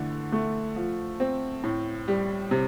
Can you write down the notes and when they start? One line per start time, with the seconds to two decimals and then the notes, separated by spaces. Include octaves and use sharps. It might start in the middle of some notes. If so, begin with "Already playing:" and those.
Already playing: D3 E3 A3
0.32 A3
0.76 F3
1.20 C4
1.64 A2
2.08 G3
2.51 C3